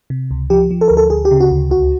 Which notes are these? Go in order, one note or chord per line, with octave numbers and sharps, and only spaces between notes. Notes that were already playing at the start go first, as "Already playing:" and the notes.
C3
C#2
F3 G4
F3
A4
D2 A#4
A4
D2 G#4
G4
C#3
F#4
D2
C#2 F#4